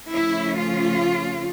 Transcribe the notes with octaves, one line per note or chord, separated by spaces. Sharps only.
C#3 F3 A3 C#4 E4
F4